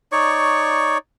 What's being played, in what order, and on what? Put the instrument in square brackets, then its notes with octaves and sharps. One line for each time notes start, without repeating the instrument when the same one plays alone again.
[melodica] D#4 C#5 D5 C#6